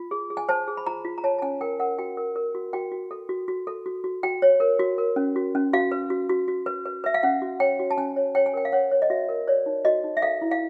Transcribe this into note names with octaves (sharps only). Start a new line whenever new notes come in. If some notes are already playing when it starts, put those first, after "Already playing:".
Already playing: F4
G#4
G#4
G#5
C5 A5
G#4
B5
F4 A#5
F4
A#5
C#5 A5
A5
C#4 G#5
A#4 G5
A#4 F#5
F#4 G5
A#4
A#4
F#4
F#4 G5
F#4
A4
F#4
F#4
A4
F#4
F#4
F#4 G5
C#5
A#4
F#4
A#4
C#4
F#4
C#4
F#4 F5
B4
F#4
F#4
F#4
B4
B4
B4 E5
F5
C#4 F#5
F#4
C#5 G5
F#4
A5
C#4 G#5
C#5
C#5 G5
G#5
A#4 G5
F5
C#5 F#5
C#5
D#5
F#4 E5
A#4
C#5 D5
D#4
F#4 D#5
D#4
E5
A4 F5
E4
F5